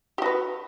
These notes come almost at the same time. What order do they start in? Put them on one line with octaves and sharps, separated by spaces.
G4 F#4 B4